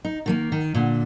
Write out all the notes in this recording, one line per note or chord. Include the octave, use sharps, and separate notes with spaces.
D#4
D#3 A3 A#3
D#3
A#2 D3